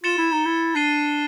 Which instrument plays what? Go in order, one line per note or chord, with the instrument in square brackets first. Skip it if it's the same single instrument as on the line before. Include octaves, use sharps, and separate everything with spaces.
[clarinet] F4 [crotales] A6 C#7 E7 G7
[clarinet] E4
D#4
E4
[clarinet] D4 [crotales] A6 C7 D#7 G7